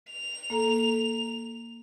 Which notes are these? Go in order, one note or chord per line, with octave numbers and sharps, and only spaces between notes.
F7
A#3 A4 A#5